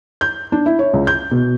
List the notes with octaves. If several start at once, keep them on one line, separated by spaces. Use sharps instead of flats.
G6
D4
E4
C#5
C#2
G6
B2